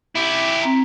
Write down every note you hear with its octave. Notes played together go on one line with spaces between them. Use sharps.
E4 G4
C4 A#5